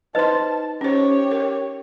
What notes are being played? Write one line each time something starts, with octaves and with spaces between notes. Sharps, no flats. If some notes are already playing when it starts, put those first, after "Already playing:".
D#4 B4 C5 D#5 A5 C6
C#4 G4 C5 C#5
A#4